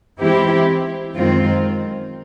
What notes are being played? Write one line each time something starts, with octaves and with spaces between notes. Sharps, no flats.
E3 G#3 C4 E4 G4
F#2 D#3 G#3 C4 F4